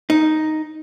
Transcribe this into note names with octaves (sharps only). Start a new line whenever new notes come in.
D#4